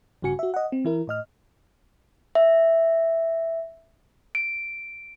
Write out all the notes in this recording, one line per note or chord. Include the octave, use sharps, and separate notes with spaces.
A1 G2 C#3 F#4 G#5 C#7
F#4 E5
D#5 F#5
C4
E3 E4 A#4
A2 D#5 F6
E5
D7